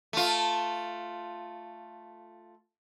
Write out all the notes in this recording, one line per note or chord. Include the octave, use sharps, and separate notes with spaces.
A3 F4